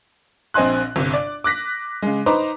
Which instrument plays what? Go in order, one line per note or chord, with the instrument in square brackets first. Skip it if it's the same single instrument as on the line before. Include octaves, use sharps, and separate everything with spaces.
[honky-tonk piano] A#1 C4 D#5 G#5 C6 F#6
G1 C3
D5
D6 F#6 A#6 B6
C#3 G#3
D#4 B4 C5 A#5 D6